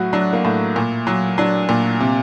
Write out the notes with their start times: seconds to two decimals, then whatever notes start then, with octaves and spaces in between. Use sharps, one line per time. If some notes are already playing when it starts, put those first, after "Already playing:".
Already playing: A2 F#3 F#4
0.13 F#3 D4
0.33 A#3
0.45 A2
0.76 A#2
1.07 F#3
1.38 F#3 D4
1.69 A#2
2.00 C3